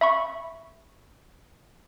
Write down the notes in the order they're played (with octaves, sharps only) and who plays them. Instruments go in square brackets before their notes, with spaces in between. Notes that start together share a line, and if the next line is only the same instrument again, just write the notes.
[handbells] E5 B5 C#6